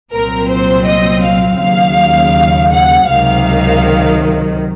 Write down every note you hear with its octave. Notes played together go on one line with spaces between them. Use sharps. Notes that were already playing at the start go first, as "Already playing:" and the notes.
C2 A#2 F#3 C4 A#4
C5
D#5
F5
D#2 C#3 F#3 F5
F#5
C#2 C3 D#3 F#3 F5